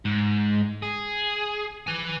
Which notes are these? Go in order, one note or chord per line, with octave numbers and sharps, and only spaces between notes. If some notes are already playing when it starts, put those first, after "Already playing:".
G#2
G#4
B4 G#5